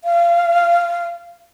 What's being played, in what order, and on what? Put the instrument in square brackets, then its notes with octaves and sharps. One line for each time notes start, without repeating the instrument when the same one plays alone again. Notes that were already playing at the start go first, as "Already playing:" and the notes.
[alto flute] F5